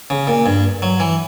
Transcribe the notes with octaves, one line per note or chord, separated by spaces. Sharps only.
C#3
A#2
G2
F#3
E3